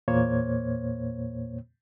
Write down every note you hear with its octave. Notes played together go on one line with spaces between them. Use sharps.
E2 A#2 A#3 C5 C#5 G#6